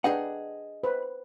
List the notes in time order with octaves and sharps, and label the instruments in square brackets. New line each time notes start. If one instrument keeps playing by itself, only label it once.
[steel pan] D4 B4 G5 [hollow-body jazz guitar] G#4 D#5 F#5
[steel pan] B4 C5